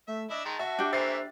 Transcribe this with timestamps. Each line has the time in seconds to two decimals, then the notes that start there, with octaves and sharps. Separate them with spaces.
0.08 A3 E5
0.30 D4 E4 D#5 E5
0.45 D#3 G#3 A5
0.59 F#4 E5
0.79 D4 G4
0.93 E3 A3 A#3 C5 E5 A6 C7